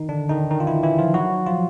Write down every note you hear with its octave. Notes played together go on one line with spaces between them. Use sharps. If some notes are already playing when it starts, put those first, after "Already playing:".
Already playing: D#3 D#4
D3 D4
D#3 D#4
D#3 D#4
F4
E3 E4
E3 E4
F3 F4
F#3 F#4
F3 F4